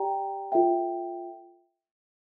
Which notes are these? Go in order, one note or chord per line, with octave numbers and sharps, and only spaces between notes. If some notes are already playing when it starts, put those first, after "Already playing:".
Already playing: G4 D5 G5 A#5
F4 A4 E5 G5